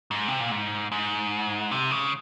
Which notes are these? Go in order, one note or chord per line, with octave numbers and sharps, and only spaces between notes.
G#2
C3
A#2
G#2
G#2
C3
C#3